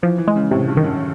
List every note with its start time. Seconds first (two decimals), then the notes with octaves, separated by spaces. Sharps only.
0.03 E3 F3
0.18 E3
0.28 G#3
0.36 C#3
0.51 A2 C3
0.68 G2
0.77 D#3
0.84 F#2